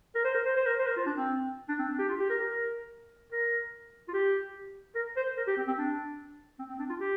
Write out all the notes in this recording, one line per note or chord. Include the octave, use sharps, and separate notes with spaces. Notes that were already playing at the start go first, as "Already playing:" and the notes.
A#4
C5
A#4
C5
C5
A#4
C5
A#4
F4
D4
C4
D4
C4
D4
G4
F4
G4
A#4
A#4
A#4
A#4
F4
G4
A#4
C5
A#4
G4
C4
C4
D4
C4
C4
D4
F4
G4